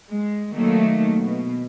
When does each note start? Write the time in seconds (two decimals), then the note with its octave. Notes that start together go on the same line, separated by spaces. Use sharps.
0.10 G#3
0.54 D#3 F#3 A3 A#3
1.18 B2